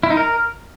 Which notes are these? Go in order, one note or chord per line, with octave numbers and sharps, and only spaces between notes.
E4
D#4
A#4